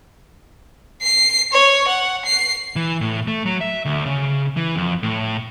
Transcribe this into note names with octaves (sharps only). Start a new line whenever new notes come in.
C7
C#5
F#5
C7
E3
A2
A3
F#3
E5
D2
C#3
E3
F2
A2